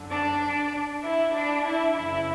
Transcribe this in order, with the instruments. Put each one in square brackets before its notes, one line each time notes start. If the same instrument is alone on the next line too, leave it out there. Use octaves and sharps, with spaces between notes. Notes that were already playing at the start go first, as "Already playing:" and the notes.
Already playing: [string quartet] F#2 D3
D4 D5
E4 E5
D4 D5
E4 E5
F#2 C#3 E3 E4 E5